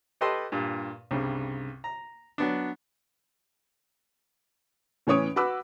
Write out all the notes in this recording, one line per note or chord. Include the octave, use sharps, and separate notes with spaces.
G4 A4 B4 D#5 A5 C6
G2 A#2
C2 G2 C#3
A#5
F#3 B3 D4
A2 E3 C#4 C#5 D#6 D7
F#4 B4 B5 D6 E6